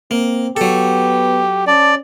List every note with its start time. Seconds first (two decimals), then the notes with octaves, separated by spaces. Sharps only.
0.11 A#3 C4
0.57 F#3 B3 G4 A4
1.67 C#4 D5 A5